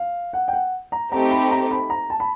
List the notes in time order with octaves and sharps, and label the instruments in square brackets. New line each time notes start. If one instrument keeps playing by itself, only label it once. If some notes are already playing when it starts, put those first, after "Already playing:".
Already playing: [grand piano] F5
F#5
G5
F#5
A#5
[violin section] A3 C4 D#4 G4 [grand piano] A#5
[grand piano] B5
A#5
B5
A#5
A5
B5